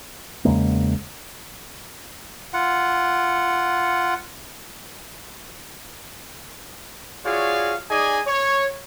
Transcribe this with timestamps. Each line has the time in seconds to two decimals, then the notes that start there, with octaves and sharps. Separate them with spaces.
0.45 E2 C#3 G#3 A#3
2.53 F4 F#5
7.25 F4 F#4 G#4 C#5 D5 F5
7.90 D#4 G#4 D5 D#5 G#5
8.26 C#5